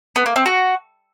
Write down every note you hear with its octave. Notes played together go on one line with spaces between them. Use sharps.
B3
A#3
C4
F#4